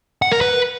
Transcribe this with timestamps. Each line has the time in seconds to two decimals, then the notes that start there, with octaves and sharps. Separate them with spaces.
0.22 F#5
0.32 A#4
0.41 B4